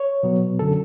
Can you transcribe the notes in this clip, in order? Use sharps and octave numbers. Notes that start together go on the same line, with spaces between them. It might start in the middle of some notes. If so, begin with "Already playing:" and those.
Already playing: C#5
B2 F#3 B3
F#2 D3 F#3 C#4 A4